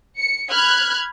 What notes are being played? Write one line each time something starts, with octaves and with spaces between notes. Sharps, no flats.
C#7
B5 F6 F#6 G#6